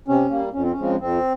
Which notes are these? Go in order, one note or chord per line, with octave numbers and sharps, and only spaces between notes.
C3 C#4
G3 A#3
F2 C#4
C4
C#4
C#3 F3 G#3 C4
F2 C4